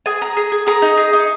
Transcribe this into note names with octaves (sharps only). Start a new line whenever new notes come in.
G#4 G#5
G#4 A#5
G#4
G#4
G#4 A#5
D#4
G#4
D#4